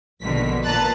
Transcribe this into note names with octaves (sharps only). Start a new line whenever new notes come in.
A#1 B2 D3 D#3 B6
A#2 B4 A5 A#5 F#6 A6